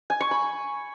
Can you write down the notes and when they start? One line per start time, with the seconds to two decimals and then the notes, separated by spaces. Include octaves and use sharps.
0.10 G#5
0.20 C#6
0.31 B5